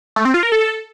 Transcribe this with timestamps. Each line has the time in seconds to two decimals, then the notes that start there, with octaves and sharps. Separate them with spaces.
0.16 A3
0.25 C4
0.34 F4
0.43 A#4
0.52 A4